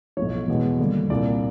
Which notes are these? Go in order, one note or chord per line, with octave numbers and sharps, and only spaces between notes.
B1 A2 F3 C#5
E2 B2 G#3 B3
D#2 D3 G3 A#3
C2 A#2 G3 A#3 D5